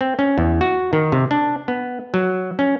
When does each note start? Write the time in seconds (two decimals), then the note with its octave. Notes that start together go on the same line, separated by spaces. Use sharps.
0.01 C4
0.19 C#4
0.38 E2
0.61 F#4
0.93 D#3
1.12 C3
1.31 D4
1.68 B3
2.14 F#3
2.59 C#4